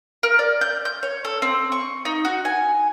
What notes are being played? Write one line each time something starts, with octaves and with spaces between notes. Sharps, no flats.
A#4
D5
G6
G6
C#5
A4
C4
C#6
D#4
F#4
G#5